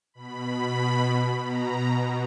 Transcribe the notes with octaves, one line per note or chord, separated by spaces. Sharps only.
B2 B5
B2 A#5